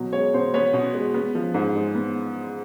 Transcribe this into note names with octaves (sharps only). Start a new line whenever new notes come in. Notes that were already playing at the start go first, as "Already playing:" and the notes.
Already playing: B2 F#3
G#3 C#5
B2 C5
B3 C#5
B2
G#3
B3
F3
G#2
G#3
B3